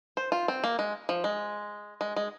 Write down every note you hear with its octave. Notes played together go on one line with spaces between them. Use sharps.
C5
F4
C4
A#3
G#3
F3
G#3
G#3
G#3